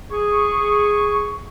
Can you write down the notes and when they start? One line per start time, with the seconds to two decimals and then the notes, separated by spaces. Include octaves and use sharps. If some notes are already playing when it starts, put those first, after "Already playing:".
0.11 G#4 C#6